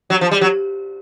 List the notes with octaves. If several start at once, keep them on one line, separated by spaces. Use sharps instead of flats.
F#3
F3
G3
F#3